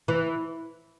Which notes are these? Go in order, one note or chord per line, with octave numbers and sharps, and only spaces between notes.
E3